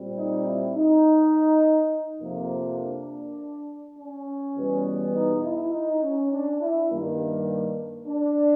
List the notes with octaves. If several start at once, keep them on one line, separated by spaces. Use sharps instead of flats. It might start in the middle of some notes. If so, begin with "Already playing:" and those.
Already playing: A#2 G3 C4
D#4
E4
D#4
F2 C3 F3 A#3
D4
C#4
E2 B2 G3 B3
D#4
E4
D#4
C#4
D4
E4
G2 D#3 G3 A#3
D4